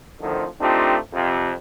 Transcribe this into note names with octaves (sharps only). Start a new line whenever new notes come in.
F2 A2 D3 D#3 F3
A3 C4 D4 D#4 F4 G4
F2 C3